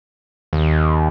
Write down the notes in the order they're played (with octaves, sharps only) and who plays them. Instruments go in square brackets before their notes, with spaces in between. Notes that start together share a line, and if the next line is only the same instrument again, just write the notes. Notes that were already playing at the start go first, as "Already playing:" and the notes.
[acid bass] D#2